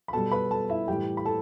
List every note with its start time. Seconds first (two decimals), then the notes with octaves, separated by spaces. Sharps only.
0.08 B5
0.13 B2 G3 A4 A5
0.32 B4 B5
0.51 A4 A5
0.69 E4 E5
0.88 A2 E3 G3 G4 G5
1.17 B5
1.26 A4 A5